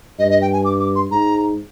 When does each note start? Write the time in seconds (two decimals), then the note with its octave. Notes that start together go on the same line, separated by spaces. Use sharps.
0.19 G2 D#5
0.30 D#5
0.42 G5
0.53 G#5
0.65 D6
0.80 D6
0.96 C6
1.11 G#2 A#5